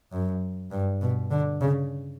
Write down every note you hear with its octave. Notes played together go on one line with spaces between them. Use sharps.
F#2
G2
B2
D3
C#3